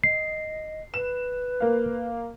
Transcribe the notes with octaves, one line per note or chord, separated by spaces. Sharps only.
D#5 C7
B4 E7
A#3 F5